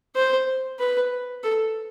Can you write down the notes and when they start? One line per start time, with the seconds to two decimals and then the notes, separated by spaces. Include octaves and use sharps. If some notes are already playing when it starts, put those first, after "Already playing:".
0.15 C5
0.79 B4
1.43 A4